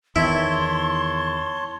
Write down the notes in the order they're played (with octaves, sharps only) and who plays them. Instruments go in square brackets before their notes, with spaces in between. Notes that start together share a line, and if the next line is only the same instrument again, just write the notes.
[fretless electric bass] E2 D#3 [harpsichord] E4 [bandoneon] C#5 A5 [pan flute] C6